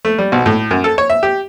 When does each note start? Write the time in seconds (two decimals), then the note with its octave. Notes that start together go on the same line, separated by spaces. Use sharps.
0.05 A3
0.18 G3
0.32 B1
0.46 A2
0.71 F#2
0.84 A4
0.98 C#5
1.10 E5
1.23 G4